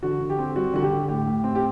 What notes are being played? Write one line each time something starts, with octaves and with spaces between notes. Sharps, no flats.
D3 F#4
D3
G4
C4
G3 F#4
D3 F#4
G4
D3
A2 G4
A2
C4
G4